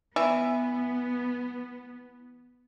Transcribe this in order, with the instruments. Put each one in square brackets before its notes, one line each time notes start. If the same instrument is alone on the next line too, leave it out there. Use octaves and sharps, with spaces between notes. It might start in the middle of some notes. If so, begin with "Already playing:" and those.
[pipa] E3 E5 [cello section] B3